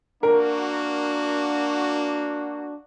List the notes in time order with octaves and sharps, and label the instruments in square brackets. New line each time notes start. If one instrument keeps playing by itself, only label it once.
[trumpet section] A#3 F#4 [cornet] D4 [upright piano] A#4